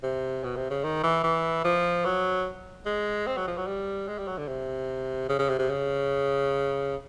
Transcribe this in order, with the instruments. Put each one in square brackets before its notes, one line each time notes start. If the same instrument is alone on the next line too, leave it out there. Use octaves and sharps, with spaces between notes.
[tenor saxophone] C3
B2
C3
C#3
D#3
E3
E3
F3
F#3
G#3
C4
F#3
F3
F#3
G3
G#3
G3
F#3
D3
C3
C#3
C#3
C3
C3
C#3